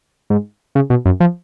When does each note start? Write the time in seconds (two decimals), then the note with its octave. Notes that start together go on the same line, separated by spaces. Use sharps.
0.30 G#2
0.75 C#3
0.90 B2
1.05 F#2
1.20 F3